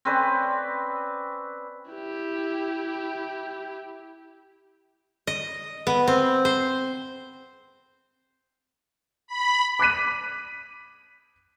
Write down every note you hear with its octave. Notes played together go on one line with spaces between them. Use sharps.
C4 C#4 B4 D5
E4 G4
D#5
B3
C4
C5
B5
D6 F#6 B6 D#7